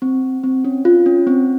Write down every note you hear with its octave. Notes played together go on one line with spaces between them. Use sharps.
C4
C4
C#4
F4
C#4
C4